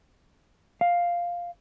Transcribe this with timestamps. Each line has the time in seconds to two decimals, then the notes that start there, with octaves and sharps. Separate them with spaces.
0.81 F5